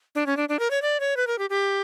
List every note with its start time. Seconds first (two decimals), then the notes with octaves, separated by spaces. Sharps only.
0.15 D4
0.26 C#4
0.37 D4
0.49 D4
0.59 A#4
0.71 C#5
0.82 D5
1.00 C#5
1.17 B4
1.27 A#4
1.39 G4
1.50 G4